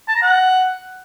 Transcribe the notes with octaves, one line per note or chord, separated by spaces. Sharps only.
A5
A#5
F#5